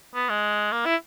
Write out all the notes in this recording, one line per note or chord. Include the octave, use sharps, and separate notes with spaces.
B3
G#3
A#3
E4